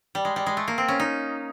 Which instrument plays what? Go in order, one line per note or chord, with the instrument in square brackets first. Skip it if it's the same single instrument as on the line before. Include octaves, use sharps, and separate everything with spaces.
[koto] G3
G#3
G3
G#3
A3
A#3
C4
C#4
D#4